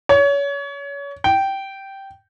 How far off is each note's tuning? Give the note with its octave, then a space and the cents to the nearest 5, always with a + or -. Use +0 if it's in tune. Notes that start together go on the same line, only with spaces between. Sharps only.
C#5 +30
G5 -10